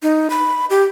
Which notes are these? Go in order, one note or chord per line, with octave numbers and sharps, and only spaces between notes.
D#4
B5
G4